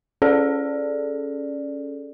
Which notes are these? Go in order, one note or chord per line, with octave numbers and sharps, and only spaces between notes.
C#4 G#4 A4 D5